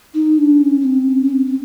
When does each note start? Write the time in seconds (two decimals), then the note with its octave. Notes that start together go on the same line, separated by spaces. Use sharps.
0.14 D#4
0.38 D4
0.61 C#4
0.80 C#4
0.85 C4
1.09 C#4
1.23 C#4
1.33 C4
1.46 C4